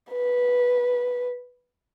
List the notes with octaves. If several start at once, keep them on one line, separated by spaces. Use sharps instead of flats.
B4